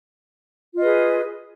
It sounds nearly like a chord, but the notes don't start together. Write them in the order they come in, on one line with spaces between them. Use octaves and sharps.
F4 D#5 B4 G#4